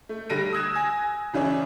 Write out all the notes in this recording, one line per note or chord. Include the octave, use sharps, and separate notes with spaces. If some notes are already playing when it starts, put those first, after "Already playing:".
A3
D3 G3 F#6 A#6 D7 D#7
D#6 E6 F#6 G#6 E7
G#5 A#6
C#3 E3 C#4 D4 E4